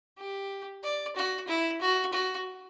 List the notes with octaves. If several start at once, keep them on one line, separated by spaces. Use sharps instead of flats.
G4
D5
F#4
E4
F#4
F#4